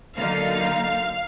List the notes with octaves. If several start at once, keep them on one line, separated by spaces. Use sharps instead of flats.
D3 F#3 A#3 D#4 F5